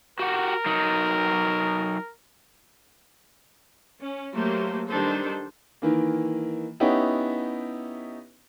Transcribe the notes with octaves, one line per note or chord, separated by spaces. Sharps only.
F#4 G4 A#4 F#5
F#3 D#4
C#4
F#3 A3 A#3 G4 C5
D#3 G3 D4 A4 C5
D#3 E3 A#3
B3 C#4 D#4 E4 G4